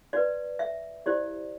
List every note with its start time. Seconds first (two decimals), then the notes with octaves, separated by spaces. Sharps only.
0.13 F#4 B4 D5
0.59 E5
1.06 E4 G4 C5 D5